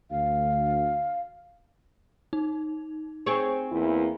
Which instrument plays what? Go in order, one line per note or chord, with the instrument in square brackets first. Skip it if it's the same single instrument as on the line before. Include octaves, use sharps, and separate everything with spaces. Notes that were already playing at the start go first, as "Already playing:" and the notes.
[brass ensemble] D2 [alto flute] F5
[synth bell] D#4
[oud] C4 G#4 C#5
[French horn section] E2 A#3 E4